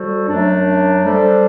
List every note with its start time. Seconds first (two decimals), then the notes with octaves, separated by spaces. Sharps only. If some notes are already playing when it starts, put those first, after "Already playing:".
Already playing: G3 F#4 A4 C5
0.28 F#2 F#3 A3 D4
1.02 G3 D4 A4 C5